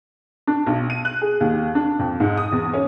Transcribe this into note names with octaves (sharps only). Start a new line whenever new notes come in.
D4
B1
D#7
F#6
G#4
D#2
D4
F2
G#2
D#6
E2
C#4